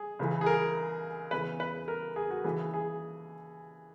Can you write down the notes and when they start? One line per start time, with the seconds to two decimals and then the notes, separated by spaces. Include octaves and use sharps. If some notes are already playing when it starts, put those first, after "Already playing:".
Already playing: G#4
0.19 C#2 C#3 E3
0.41 G#4
0.46 A#4
1.31 E2 C#3 E3 B4
1.60 B4
1.88 A#4
2.16 G#4
2.30 F#4
2.44 D#2 C#3 E3 G#4
2.74 G#4